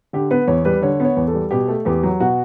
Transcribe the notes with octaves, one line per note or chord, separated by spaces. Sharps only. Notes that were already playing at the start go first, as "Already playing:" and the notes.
D3 G4
B3 B4
E2 C#5
G3 B4
D3 C#5
B3 C#5
E2
A4
G3
B2 G4
A3
E2 G4
F#3
B2 F#4